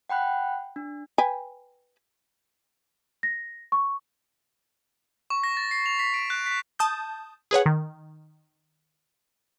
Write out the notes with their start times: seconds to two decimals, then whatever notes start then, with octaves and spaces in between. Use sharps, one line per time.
0.09 F#5 G5 B5 F#6
0.76 D4
1.18 B4 G5 G#5
3.23 A#6
3.72 C#6
5.30 C#6
5.44 A#6
5.57 A6
5.71 C7
5.86 F7
5.99 B6
6.14 D7
6.30 F#6
6.46 B6
6.79 A5 D#6 G6
7.51 G#4 B4 C#5 F#5
7.66 D#3